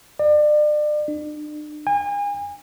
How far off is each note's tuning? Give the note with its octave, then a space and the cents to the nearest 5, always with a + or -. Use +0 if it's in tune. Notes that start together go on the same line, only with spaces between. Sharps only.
D5 +35
D4 +40
G#5 -35